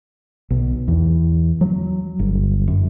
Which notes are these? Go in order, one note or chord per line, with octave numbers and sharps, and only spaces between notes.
B1
E2
F#3
G1
F#2